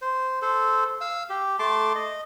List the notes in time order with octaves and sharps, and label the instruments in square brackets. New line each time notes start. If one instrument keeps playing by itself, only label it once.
[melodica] C5
A4 C5
F5 E6
G4
A3 A5 C6 D6
D#5